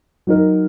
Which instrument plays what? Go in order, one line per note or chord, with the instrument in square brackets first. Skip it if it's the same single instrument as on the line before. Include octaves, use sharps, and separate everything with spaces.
[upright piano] F#3 D#4 A#4